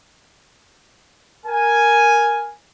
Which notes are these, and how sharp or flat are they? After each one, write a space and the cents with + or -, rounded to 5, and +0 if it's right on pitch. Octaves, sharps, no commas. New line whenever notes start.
A#4 +0 G#5 +0